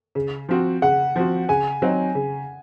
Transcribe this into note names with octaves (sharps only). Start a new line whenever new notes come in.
C#3
F3 C4 F#4
C#3 F#5
F3 C4 F#4
C#3 G#5
F#3 C4 D#4
C#3